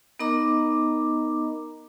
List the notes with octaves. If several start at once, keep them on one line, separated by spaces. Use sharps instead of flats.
B3 D#4 A#4 D#5 A#5 D6